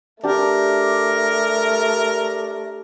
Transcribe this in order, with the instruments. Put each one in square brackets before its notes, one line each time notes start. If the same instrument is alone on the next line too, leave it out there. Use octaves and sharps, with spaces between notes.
[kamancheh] A3 [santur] D4 G4 [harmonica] A#4